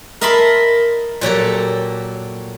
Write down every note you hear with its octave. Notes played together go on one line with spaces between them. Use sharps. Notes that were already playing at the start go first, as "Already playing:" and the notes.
A#4 D#5 E5 A5 B5 C6
A#2 F#3 G4 A4